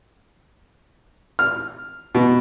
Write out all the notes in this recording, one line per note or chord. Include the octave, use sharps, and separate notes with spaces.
F6
B2